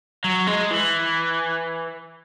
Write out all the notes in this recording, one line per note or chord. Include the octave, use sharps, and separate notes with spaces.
F#3
G#3
E3